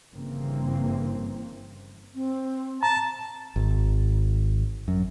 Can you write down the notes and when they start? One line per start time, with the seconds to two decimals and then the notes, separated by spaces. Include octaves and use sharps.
0.12 G1 G2 C#3 E3 A#3 C4
2.15 C4
2.83 A5 A#5
3.56 G#1
4.88 F#2